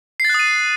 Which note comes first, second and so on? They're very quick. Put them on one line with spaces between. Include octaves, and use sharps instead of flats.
C7 A6 F#6 D#6 D#7